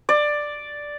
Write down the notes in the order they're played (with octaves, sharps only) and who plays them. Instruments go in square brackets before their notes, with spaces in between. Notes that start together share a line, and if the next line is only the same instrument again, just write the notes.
[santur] D5